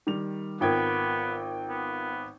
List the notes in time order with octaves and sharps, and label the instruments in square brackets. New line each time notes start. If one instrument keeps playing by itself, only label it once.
[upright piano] D#3 G3 F7
[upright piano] G#1 G5 G#6 [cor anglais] B3 [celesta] F4 A#4
[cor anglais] B3